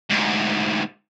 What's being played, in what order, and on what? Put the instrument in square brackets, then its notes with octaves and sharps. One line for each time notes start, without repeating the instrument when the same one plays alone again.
[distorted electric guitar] D2 G#2